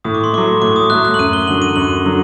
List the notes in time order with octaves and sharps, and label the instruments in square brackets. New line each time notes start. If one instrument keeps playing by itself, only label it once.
[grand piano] A2 [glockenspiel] D#6
[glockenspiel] D6
C6
[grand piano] F#3 A3 [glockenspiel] D6
[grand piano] A2 [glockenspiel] D6
[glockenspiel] D#6
[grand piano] F#3 A3 [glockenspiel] F#6
[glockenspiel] F#6
F#7
[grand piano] F#2 [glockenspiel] D#7
[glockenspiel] G7
[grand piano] D3 F#3 [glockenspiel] F#7
[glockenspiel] D#7
[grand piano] F#2 [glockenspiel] F#7
[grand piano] D3 F#3